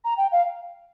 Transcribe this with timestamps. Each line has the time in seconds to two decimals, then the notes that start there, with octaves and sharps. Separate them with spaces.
0.05 A#5
0.18 G5
0.32 F5